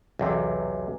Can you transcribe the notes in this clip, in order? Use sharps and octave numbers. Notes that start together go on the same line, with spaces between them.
B1 E2 C3